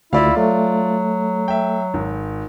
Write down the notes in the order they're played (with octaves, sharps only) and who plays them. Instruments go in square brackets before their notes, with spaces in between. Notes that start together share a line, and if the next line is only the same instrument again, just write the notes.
[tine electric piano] D2 [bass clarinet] E4 [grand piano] F4 D5 F5
[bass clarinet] F#3 [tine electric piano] A3
[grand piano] E5 G5
G#1